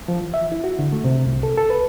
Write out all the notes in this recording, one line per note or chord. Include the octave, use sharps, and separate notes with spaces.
F3
E3
E5
E4
F#4
D3
A3
C3
C2
A4
A4
B4